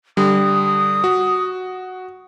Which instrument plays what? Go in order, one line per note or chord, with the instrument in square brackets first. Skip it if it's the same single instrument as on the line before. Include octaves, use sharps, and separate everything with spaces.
[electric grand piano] D3 G3 [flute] D#6
[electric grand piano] F#4